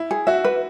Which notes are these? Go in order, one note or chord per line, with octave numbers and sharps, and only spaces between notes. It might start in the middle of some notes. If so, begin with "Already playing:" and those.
Already playing: E4
G#4
F#4 E5
B4